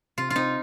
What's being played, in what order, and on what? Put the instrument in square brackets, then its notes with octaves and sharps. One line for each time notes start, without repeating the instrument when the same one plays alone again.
[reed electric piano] C3 [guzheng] F4
[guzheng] F4
[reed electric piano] C4 [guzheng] D#4